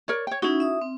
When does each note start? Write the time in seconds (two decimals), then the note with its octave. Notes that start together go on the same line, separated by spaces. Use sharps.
0.08 A#4 C#5 D5
0.27 C#5 G5
0.42 C#4 D#4 E4 F#4
0.60 E5 D#6
0.82 C4